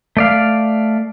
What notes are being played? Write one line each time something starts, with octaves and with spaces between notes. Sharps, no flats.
A3 D5 F5